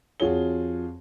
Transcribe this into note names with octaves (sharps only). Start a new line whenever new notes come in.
F2 F4 F#4 G#4 C#5 G7